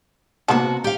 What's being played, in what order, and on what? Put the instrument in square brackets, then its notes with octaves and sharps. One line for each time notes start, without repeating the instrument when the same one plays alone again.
[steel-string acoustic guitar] C3 F#4 [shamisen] A#3 B3 A5
[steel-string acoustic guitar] G4 F5